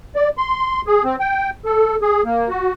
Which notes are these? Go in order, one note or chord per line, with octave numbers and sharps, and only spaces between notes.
D5
C6
G#4
C4
G5
A4
G#4
A#3
F#4